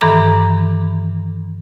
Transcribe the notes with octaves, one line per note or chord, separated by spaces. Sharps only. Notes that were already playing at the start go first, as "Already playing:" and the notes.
G2 D#3 E3 A4 A#5 D6